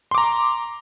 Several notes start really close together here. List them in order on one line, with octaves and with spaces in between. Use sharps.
C6 D6 A#5